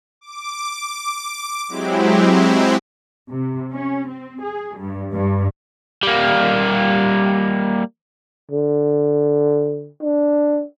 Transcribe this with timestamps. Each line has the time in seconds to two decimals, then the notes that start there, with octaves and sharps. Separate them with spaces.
0.21 D6
1.68 F#3 G#3 C4 E4 G4
3.29 C3
3.72 C#4
4.09 C4
4.42 G#4
4.76 G2
5.13 G2
6.03 G3 A#3
8.51 D3
10.02 D4